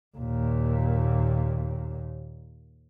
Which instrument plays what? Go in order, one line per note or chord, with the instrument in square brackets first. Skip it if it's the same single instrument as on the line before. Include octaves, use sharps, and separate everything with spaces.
[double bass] D#2 A#2